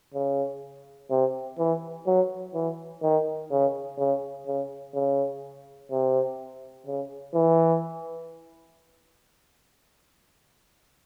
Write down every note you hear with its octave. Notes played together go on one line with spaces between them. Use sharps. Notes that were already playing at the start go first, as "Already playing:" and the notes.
C#3
C3
E3
F#3
E3
D#3
C#3
C#3
C#3
C#3
C3
C#3
E3